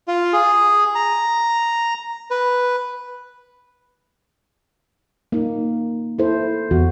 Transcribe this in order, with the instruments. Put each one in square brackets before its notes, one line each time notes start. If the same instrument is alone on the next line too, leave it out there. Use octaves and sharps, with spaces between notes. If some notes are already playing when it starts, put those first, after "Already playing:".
[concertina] F4
G#4
A#5
B4
[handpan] A#3 D#4
E4 A4 C5
[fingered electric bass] E2 [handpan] F#4